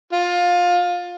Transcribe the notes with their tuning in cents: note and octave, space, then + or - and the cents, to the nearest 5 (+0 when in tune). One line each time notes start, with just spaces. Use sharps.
F4 +20